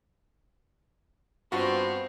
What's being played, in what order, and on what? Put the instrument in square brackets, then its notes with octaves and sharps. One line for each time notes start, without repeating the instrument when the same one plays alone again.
[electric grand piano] G2 F4 F#4 [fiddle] B3 C4